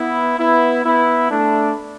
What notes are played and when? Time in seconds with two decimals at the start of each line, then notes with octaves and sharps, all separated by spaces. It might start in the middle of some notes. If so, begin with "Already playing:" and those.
Already playing: B3 E4
0.38 B3 E4
0.85 B3 E4
1.31 A3 D4